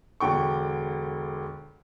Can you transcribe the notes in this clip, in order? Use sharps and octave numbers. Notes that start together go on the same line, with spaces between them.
E1 D3 G5 C#6